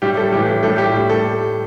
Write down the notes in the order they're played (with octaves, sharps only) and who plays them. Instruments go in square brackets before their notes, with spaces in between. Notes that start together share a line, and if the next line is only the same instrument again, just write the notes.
[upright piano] A2 G3 G4
A4
A2 E3 G3 G4
A2 G3 A4
G4
A2 G3
A4